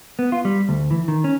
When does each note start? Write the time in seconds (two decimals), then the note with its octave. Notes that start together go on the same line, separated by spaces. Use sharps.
0.19 B3
0.32 F4
0.45 G3
0.69 D2
0.91 E3
1.08 D#3
1.24 C#4